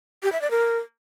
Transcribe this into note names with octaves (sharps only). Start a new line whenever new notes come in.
G4
E5
D5
A#4